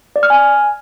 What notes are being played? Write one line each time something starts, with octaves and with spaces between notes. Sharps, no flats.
D5
F6
G#5